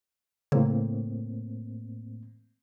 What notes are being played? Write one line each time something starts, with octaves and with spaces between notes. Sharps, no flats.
A2 C#3 A#3 C4